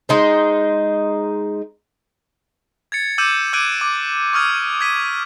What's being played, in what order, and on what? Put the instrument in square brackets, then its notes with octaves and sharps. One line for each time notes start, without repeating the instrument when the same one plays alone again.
[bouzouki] G#3 D#4 C5
[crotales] G#6 A6 C#7
D6 E6 G6 C#7 D#7 E7
D6 E6 F#6 G#6 D7 D#7
D6
C#6 D#6 F6 G#6
G#6 B6 D#7